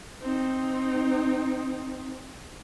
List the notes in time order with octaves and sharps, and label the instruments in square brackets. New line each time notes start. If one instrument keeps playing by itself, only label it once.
[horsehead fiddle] C4 D#4